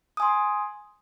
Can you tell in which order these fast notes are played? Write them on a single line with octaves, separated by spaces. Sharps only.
D#6 G#5 C6